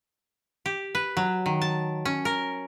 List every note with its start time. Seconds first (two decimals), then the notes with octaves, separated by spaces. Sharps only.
0.66 G4
0.95 B4
1.17 F#3
1.46 D#3
1.61 A5
2.05 C#4
2.25 A#4